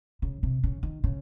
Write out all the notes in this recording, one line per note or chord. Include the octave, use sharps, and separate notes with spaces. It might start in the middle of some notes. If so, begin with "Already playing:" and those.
C#3
C3
C#3
D#3
C#3